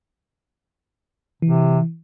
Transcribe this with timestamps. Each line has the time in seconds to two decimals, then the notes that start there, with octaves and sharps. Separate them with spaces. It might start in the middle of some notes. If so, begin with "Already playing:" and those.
1.42 C3 E3